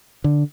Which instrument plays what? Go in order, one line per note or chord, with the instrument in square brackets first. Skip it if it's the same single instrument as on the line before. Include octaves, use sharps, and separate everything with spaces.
[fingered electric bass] D3